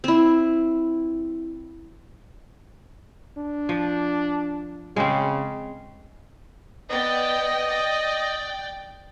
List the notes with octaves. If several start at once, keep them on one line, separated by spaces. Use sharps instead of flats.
C4 E4
D4
F3
C#3 G#3 C4
B3 D5 D#5 G5
D5 G5